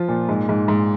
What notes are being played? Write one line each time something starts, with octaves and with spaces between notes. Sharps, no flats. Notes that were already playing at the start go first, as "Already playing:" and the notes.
Already playing: F3 F4
A#2
G#2
G#2
G#2